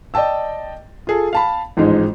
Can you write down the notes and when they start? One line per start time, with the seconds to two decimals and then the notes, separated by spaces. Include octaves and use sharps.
0.14 D5 D#5 G5 A5 E6
1.07 F4 G#4 A4
1.33 F5 A5 B5
1.77 A1 G#2 F3 G#3 D#4 C5